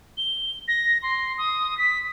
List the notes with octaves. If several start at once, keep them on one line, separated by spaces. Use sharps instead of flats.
G7
A#6
C6
D#6
B6